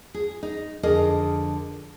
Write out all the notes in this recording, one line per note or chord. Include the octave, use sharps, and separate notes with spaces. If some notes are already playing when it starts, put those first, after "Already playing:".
G#4
D#4
F2 D3 G#4 A#4 D#5